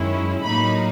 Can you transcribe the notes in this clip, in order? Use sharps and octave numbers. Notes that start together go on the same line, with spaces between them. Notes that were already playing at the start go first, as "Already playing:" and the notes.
Already playing: F#2 D#3 G#3 C#4 E4
A2 F#3 A#3 D#4 B5